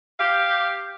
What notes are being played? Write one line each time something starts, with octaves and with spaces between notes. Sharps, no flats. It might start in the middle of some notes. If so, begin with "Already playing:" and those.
G4 F5